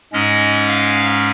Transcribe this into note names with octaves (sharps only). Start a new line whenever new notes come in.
G#2 G#3 C#4 D#5
F5